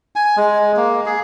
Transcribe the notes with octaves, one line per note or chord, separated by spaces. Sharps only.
G#5
G#3
A#3
G#4